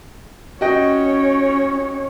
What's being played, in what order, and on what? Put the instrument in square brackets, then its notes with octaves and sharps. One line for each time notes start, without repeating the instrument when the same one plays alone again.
[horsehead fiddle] C#4 C#5 [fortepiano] F#4 D#5 G5